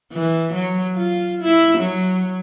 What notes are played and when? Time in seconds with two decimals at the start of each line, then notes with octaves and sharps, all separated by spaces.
0.13 E3
0.54 F#3
0.96 F4
1.42 E4
1.79 F#3